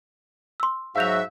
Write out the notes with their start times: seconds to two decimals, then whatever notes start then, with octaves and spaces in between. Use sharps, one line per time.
0.60 C6 E6
0.96 G#2 F#3 F#4 E5 F5 G6 F7